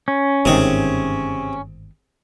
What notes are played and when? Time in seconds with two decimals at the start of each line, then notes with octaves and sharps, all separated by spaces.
0.08 C#4
0.45 G1 G#2 C3 D#3 G#4